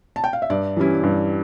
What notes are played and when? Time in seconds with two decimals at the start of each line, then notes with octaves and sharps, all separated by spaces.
0.16 A5
0.24 G5
0.33 F5
0.42 E5
0.50 G2 D5
0.77 E3 G3 C#4 E4
1.03 G2